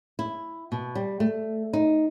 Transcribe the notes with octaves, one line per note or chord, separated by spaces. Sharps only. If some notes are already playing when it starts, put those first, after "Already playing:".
E4
B2
G3
A3
D#4